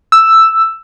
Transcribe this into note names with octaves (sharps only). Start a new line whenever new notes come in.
E6